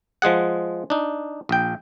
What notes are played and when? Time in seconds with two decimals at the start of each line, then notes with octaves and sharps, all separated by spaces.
0.22 F3 G#3 G#4 F#5
0.90 D4 D#4
1.49 A#1 G5